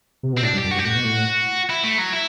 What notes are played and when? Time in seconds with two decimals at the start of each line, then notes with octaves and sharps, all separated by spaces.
0.23 C3
0.33 B2 C4
0.43 A2 D4
0.54 G2
0.57 G4
0.64 F#2
0.71 F#4
0.74 G2
0.79 G4
0.85 A2 F#4
0.95 B2
1.04 A2
1.70 E4
1.83 A3
1.98 F#3
2.13 E4